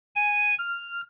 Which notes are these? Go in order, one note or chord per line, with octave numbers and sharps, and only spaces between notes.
G#5
F6